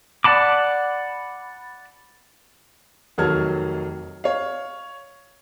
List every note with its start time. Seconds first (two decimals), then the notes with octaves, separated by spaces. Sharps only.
0.24 D5 F#5 A5 B5 D6
3.18 F1 D#3 F#3 A5 F6 G#6
4.24 C#5 F5